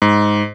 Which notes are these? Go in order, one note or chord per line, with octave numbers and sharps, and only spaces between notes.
G#2